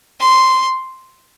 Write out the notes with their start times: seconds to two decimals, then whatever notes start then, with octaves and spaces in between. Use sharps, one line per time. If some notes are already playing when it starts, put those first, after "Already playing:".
0.20 C6